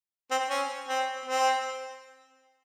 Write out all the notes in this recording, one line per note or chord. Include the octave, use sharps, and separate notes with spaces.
C4
C#4
C4
C4